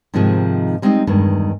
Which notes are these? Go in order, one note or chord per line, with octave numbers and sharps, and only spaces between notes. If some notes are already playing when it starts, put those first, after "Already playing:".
G#2 C3 D#3 F3 G#3
G3 G#3 C4 D4 D#4
E2 G2 D#3 G#3